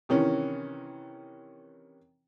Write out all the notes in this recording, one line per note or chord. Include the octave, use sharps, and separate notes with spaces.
C3 D#3 E3 C#4